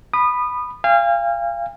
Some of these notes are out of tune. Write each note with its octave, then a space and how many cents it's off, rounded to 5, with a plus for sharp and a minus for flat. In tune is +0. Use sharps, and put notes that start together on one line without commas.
B5 +0 D#6 -25
F5 -25 G#5 -45